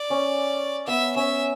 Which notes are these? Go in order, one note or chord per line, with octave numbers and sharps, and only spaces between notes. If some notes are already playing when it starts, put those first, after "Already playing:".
Already playing: D5
C#4
B3 E5
C#4 E5